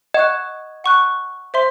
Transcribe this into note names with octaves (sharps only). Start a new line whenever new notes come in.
D#5 F#5 C#6 F#6
F#5 C#6 F#6
C5 E5 C6